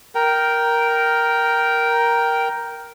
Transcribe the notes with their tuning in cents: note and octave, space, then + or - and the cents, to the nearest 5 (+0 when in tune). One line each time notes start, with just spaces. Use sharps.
A#4 +5 G5 -10